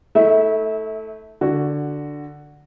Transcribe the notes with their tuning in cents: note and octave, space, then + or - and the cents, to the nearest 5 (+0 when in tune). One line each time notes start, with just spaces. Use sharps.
A3 +0 E4 -35 E5 -25
D3 +0 F#4 +0